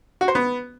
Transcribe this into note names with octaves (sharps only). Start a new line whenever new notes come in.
F#4
C5
B3